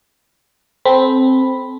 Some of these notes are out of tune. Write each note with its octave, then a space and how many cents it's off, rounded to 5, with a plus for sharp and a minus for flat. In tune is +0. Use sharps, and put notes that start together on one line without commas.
C4 +0 A4 -30 B5 +0